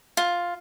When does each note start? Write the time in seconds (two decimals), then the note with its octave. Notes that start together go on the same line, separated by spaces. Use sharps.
0.17 F4